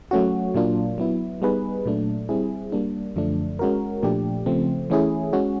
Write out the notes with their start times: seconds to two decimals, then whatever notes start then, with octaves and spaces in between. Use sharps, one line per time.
0.11 F#3 A3 C#4 F#4
0.55 A#2 F#3 A#3 D4 F4
0.98 F#3 B3 E4
1.42 G3 B3 D#4 G#4 B4
1.85 A#2 F#3 A3 D4
2.29 G3 C4 E4 G#4
2.72 G3 A#3 D4
3.16 F#2 D3 F3 A3 D4
3.59 G#3 C#4 F#4 A#4
4.03 A#2 F3 A3 D4 G4
4.46 C#3 F3 A3 C4
4.90 E3 A3 C#4 E4 G#4
5.33 G#3 C#4 F#4